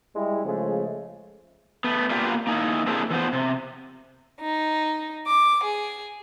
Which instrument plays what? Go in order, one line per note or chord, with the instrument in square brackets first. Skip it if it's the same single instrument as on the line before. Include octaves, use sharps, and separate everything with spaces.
[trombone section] G3 G#3 E4
C#3 F3 G#3 A3
[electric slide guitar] A3 B3
A#3 B3 F4 G4 B4 D5
A#3 D#4 E4
A#3 C4 D4 E4 G4 G#4
E3 F3 B3 C5
C3
[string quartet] D#4
D6
G#4